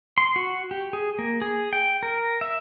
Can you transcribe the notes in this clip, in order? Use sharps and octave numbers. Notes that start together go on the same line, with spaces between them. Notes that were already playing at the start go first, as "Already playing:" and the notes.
C6
F#4
G4
G#4
A#3
G#4
G5
A#4
E5